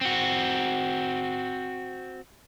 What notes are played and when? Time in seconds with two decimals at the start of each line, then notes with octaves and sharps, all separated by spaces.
0.01 C4 F#4